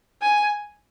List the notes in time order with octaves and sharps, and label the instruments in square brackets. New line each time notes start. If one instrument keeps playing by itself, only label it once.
[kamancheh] G#5